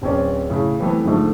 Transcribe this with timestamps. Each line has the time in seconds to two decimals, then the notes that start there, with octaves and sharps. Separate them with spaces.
0.02 D1 C4 C#4 D5
0.50 A2 C#3
0.79 E3 G3 A3 B3 C4
1.04 G#2 D3 F3 A3